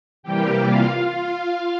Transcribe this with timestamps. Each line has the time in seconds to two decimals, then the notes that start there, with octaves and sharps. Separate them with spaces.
0.23 C3 E3 G3 A#3 G4 G5
0.65 F4 F5